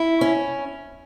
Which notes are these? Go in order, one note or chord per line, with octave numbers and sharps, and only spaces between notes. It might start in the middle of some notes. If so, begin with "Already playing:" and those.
Already playing: E4
C#4